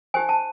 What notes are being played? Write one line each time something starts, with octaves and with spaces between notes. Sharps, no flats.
D#4 G4 C5 G#5
A5